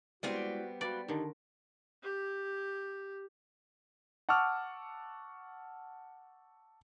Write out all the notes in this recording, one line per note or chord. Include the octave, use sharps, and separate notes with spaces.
G3 G#3 B3 C4 E4 F#4 D5
F#4 B4 D5 F5 B5
D3 D#3 D#4 G4 A5
G4
F#5 A5 C#6 D6 E6 F6